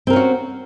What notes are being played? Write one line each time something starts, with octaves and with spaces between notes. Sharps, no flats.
C4 C#4 F#4 A#4